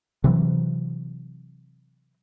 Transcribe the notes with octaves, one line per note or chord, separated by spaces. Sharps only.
C3 E3 F#3